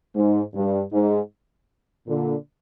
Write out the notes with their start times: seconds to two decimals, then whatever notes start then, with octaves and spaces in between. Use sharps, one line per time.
0.15 G#2
0.54 G2
0.92 G#2
2.07 A#2 D3